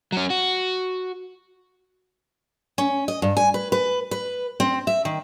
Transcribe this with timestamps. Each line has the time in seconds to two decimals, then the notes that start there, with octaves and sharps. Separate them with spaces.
0.12 F#3 C#4
0.30 F#4
2.78 C#4
3.08 D#5
3.22 G2
3.37 G#5
3.54 B4
3.72 B4
4.11 B4
4.60 C4
4.87 E5
5.05 D#3